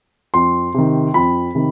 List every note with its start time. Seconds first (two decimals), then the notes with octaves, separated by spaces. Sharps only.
0.34 F2 C6
0.74 C3 D#3
1.14 F2 B5
1.55 C3 D#3